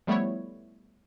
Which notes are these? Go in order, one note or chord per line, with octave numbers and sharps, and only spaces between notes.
F3 G3 A3 B3 E4 C#5